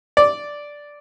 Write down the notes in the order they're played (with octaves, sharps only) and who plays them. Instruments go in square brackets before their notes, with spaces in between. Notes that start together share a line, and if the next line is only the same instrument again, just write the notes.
[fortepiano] D5